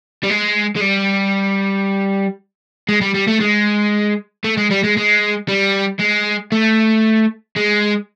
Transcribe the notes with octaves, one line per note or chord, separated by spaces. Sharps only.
G3
G#3
G#3
G3
G#3
G3
G3
A3
G#3
A3
G#3
G3
G#3
G#3
G3
G#3
A3
G#3